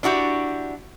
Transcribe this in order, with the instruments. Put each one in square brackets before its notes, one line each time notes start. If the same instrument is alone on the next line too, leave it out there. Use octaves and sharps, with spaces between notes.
[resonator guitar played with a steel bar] D4 E4 F#4 G4